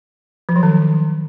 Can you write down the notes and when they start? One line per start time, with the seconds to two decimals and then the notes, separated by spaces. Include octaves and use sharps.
0.49 F3
0.56 F#3
0.63 D#3